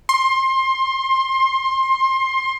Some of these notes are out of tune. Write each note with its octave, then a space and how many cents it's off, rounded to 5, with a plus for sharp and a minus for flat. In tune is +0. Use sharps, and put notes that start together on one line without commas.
C6 +25